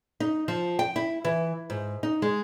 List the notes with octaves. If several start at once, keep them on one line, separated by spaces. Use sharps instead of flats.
D#4
F3
G5
E4
E3
G#2
D#4
G#3